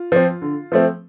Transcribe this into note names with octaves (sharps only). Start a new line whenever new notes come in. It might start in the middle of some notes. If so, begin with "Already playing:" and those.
Already playing: F4
F3 C4
D3
F3 A3 C4